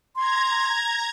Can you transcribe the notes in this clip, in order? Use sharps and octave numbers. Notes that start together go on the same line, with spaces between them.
A#5 C6 G#6